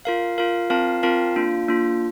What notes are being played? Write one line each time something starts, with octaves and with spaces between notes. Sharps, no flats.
F4 A#4 F5
F4 A#4 F5
C4 F4 A#4 F5 A5
C4 F4 A#4 F5 A5
A#3 D4 F4
A#3 D4 F4